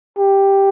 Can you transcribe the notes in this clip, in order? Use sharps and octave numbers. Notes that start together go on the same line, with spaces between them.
G4